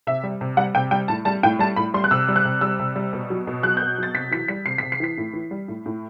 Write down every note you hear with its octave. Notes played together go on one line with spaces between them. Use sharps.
C3 E5
G3
C3
G3 F#5
C3 G5
G3 G5
A2 A5
G3 A5
A2 G5
G3 A5
A2 B5
G3 C6
F#6
C3 E6
G3
F#6
C3
G3 E6
C3
G3
B2
F#3
B2
F#3 F#6
G6
B2
F#3 A6
C3 B6
E3 B6
G3 B6
C3 C7
B6
C3
C7
E3 B6
A2
E3
G3
A2
A2